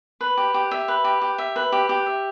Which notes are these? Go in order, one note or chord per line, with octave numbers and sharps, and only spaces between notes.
B4
G4
G4
E5
B4
G4
G4
E5
B4
G4
G4
E5